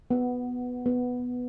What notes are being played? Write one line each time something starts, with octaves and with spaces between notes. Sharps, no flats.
B3
B3